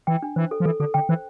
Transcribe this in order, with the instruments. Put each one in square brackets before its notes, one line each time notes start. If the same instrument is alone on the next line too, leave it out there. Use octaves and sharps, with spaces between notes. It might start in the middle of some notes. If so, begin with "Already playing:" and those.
[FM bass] E3 [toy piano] G5
[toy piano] D4
[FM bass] E3 [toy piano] C5
[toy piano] A4
[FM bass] F3
[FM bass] E3 [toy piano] A4
[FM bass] D3 [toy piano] A4
[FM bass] D3 [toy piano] G5
[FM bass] E3 [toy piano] C5